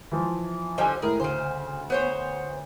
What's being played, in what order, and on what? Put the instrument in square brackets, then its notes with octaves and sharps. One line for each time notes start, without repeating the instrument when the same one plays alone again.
[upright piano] E3 F3
[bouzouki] D3 F3 G3 [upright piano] D#5 G#5
[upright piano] A2 A#4 [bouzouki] G#4
[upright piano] D2 [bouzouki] C#3 C5
[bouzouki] B3 C5 C#5